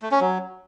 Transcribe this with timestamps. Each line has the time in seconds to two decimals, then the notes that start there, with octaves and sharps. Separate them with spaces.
0.02 A3
0.11 C#4
0.20 F#3